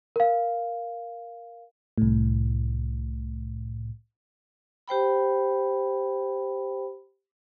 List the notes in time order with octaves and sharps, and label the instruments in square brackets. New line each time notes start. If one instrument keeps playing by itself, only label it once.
[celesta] A#4 F5
[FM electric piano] C2 A2
[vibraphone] G4 C5 G5 B5